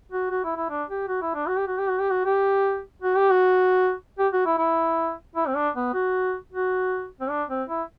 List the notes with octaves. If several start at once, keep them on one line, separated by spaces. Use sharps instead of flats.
F#4
F#4
E4
E4
D4
G4
F#4
E4
D4
F#4
G4
F#4
G4
F#4
G4
F#4
G4
F#4
G4
F#4
G4
F#4
E4
E4
E4
C4
D4
B3
F#4
F#4
C4
D4
C4
E4